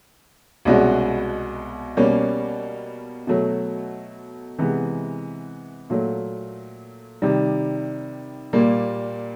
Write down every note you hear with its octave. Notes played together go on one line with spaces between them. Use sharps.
C2 B2 G#3 C#4 F#4
B2 G3 A#3 C#4
B2 F#3 A3
C3 E3 G#3 B3
A#2 F#3 A3
C3 D#3 G3
A#2 G3 A#3